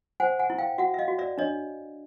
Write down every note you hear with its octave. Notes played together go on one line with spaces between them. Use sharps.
C5 F#5 G#5
F#5 G#5
E4
F5 G5
F#4 E5 F#5
E5
D#5 F5
F#4
D5 E5
D4 C#5 D#5